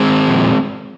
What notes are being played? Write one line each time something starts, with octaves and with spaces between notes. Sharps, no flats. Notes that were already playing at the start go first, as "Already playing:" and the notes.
Already playing: G#3 C4
A#2 F3